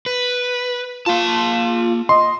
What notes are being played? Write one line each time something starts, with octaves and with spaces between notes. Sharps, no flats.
B4
A#3 F4 A5
D#5 C6